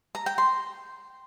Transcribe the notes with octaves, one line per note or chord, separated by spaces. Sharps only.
A#5
G5
C6